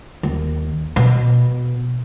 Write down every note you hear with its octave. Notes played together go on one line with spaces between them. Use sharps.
D#2
B2